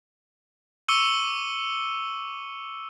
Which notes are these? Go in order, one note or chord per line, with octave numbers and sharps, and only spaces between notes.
C#6 D6 E6 C#7 D#7 G7